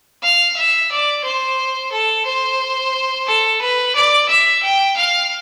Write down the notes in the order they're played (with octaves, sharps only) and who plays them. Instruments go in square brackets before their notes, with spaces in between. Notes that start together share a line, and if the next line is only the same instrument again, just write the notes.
[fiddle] F5
E5
D5
C5
A4
C5
A4
B4
D5
E5
G5
F5